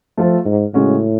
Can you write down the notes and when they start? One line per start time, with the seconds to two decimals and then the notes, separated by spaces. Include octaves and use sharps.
0.17 F3 A3 F4 A4
0.45 G#2
0.74 A2 C#3 G#3 C#4 F#4